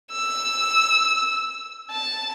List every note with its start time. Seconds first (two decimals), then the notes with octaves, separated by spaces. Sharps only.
0.12 E6
1.91 A5